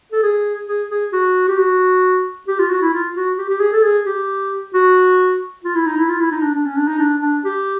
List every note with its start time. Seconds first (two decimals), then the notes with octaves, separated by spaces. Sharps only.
0.12 A4
0.22 G#4
0.67 G#4
0.90 G#4
1.13 F#4
1.48 G4
1.58 F#4
2.48 G4
2.59 F4
2.70 F#4
2.82 E4
2.93 F4
3.16 F#4
3.38 G4
3.49 G4
3.60 G#4
3.72 A4
3.83 G#4
4.06 G4
4.74 F#4
5.64 F4
5.75 E4
5.86 D#4
5.98 E4
6.09 F4
6.20 E4
6.31 D#4
6.42 D4
6.54 D4
6.65 C#4
6.76 D4
6.87 D#4
6.99 D4
7.22 D4
7.44 G4